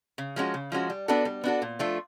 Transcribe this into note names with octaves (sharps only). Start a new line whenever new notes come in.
C#3
F3 G#3 C#4 F#4
C#3
F3 G#3 C#4 F#4
G3
B3 D4 F#4 A4
G3
B3 D4 F#4 A4
A#2
F3 A3 D4 F4